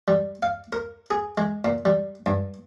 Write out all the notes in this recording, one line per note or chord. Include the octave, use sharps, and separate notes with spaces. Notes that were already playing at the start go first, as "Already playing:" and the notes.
G3
F5
A#4
G#4
G#3
A#2
G3
G2